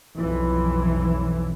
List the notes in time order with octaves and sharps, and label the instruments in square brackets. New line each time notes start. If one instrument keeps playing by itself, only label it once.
[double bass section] B1 F2 E3